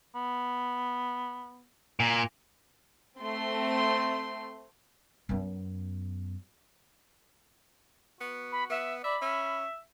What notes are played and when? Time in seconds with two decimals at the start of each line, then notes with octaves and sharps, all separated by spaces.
0.15 B3
2.00 A#2 G#5
3.20 A3 C4 C6
5.29 F#2 B3
8.21 B3 F#4
8.51 B5
8.70 B3 E5
9.04 D5 E5 B5
9.22 C#4 E5